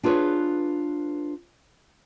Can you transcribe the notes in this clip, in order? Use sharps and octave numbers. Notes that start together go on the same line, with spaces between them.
D4 F4 G#4 B4 C#5